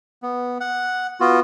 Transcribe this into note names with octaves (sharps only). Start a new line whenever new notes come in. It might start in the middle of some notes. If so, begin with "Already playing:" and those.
B3
F#5
B3 F4 F#4